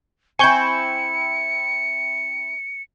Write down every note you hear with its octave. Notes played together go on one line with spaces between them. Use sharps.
C4 E4 G#5 C#6 G6 C#7